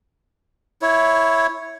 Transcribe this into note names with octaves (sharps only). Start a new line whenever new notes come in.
E4 C#5